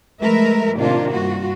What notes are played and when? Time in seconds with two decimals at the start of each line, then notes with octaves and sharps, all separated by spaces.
0.21 F3 G#3 A3 A#4 B4 E5
0.75 A2 C3 D#3 A#3 D4 F4
1.11 G2 F4 F#4